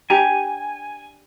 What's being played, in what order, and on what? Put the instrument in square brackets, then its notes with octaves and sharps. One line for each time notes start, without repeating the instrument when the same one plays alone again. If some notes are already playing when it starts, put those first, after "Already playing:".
[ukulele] D4 G4 A#5 [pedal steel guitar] G#5